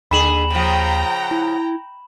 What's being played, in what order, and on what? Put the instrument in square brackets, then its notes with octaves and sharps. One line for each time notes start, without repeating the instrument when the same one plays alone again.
[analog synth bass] D#2 [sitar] D3 G#4 [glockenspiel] B5 E7 F#7
[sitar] C#3 F3 [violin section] G5 A#5
[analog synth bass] E4